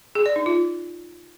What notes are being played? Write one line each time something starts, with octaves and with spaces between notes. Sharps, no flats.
G#4
D5
D#4
F4